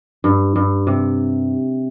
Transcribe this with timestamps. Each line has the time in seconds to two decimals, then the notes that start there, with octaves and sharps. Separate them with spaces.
0.24 G2
0.56 G2
0.87 C3